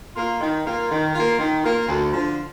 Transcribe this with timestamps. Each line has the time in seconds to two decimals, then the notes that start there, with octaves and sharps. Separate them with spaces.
0.16 A#3 F4
0.41 D#3
0.65 A#3 F4
0.90 D#3
1.14 A#3 F4
1.38 D#3
1.64 A#3 F4
1.88 D2
2.13 D3 F3